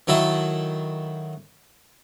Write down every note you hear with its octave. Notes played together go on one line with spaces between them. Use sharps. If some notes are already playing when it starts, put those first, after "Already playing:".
D#3 F#3 E4 A4